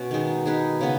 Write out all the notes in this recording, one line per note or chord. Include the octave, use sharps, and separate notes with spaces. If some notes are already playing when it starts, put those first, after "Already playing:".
Already playing: B2 C#4 F#4
D#3 G#3 D#4
G#3 D#4 G#4 B4
C#3 B3